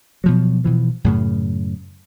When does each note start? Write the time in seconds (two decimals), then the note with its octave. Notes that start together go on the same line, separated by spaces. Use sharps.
0.24 B2 F3 F#3
0.64 B2 E3 F3
1.04 F#2 A2 C#3